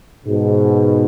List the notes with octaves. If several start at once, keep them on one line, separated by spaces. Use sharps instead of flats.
G#2 B2